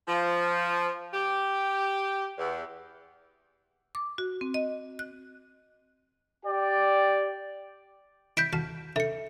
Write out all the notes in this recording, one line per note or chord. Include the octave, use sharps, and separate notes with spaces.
F3
G4
E2
D6
F#4
C4
D#5
F#6
G4 D5 G5
E4 G6 B6 D7
F#4 F5 A5
D3 E5 C#7